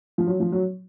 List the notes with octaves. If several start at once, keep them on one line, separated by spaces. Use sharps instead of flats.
F3
F#3
F3
F#3